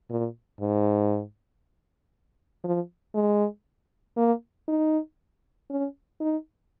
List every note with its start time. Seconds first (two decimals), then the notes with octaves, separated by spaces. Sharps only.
0.10 A#2
0.61 G#2
2.64 F3
3.15 G#3
4.17 A#3
4.68 D#4
5.70 C#4
6.20 D#4